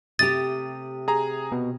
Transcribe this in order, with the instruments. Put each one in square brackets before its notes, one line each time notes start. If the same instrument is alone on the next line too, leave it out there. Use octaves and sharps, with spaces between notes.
[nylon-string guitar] C3 A3 G4 [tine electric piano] D#6 [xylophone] A6
[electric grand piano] G#4 A#5
[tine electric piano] B2